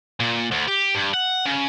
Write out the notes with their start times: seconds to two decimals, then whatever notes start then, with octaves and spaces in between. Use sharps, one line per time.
0.20 A#2
0.51 D2
0.68 G4
0.95 G2
1.14 F#5
1.46 C#3